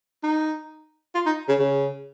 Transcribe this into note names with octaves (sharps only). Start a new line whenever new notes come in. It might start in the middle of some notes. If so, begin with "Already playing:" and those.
D#4
F4
D#4
C#3
C#3